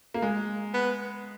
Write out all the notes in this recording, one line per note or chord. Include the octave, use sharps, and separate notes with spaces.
A#3
G#3
B3